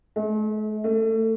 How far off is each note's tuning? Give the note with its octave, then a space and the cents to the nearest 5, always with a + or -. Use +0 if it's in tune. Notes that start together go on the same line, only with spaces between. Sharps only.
A3 -45
A3 +25